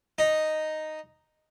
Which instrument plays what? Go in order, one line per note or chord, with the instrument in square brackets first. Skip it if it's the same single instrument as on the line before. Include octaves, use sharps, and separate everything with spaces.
[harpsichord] D#4